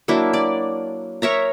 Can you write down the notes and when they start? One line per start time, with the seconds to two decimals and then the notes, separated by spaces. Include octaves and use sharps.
0.08 F#3 A#3 D4 E4
0.33 D5
1.22 A#4 C#5 E5 A#5